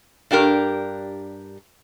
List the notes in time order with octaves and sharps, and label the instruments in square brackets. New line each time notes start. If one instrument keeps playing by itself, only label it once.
[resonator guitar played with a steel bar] G2 D4 G4 A#4